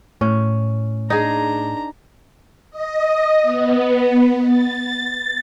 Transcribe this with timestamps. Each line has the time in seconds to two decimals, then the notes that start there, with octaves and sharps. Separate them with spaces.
0.21 A2 C#4
1.10 D4 D#4 G#4 A#5
2.71 D#5
3.41 B3
4.43 A6